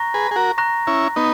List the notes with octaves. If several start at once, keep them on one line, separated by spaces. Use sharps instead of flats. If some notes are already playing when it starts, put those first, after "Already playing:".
Already playing: A#5 C#6 F#6 A#6
G#4 B4
G#4
F#4 A#4
A#5 C#6 F#6 A#6
C#4 E4
B3 D#4